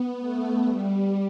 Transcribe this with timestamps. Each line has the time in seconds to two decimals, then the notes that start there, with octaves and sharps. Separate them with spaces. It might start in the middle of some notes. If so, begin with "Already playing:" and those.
Already playing: B3
0.19 A3
0.63 G3